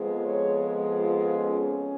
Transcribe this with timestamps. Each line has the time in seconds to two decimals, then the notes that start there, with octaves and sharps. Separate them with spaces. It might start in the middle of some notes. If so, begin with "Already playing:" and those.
Already playing: F2 F3 G#3 B3
0.24 C#5
0.98 F4
1.35 C#4